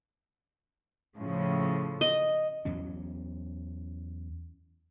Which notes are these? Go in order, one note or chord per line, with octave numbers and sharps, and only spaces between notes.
A2 C#3 F3
D#5
E2 E3 F#3 C#4